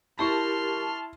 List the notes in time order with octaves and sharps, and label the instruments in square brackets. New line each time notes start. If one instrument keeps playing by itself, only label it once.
[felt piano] E4 C#6 [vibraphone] G4 A#4 [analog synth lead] A5 [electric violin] C6 F6